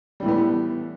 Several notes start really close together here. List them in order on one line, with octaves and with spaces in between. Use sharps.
G3 E3 A2 B3